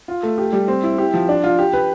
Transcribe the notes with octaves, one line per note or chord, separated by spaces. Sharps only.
F4
A3
G4
G3
C4
E4
G4
F3
D4
F4
G4
B4